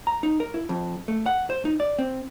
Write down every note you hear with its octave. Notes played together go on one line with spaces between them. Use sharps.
A#5
D#4
A#4
E4
F2
A3
F#5
C5
D#4
D5
C4